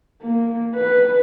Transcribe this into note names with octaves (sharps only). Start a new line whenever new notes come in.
A#3
B4